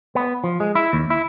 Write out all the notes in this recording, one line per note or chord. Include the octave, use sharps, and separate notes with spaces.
B3
F3
G#3
E4
D#2
E4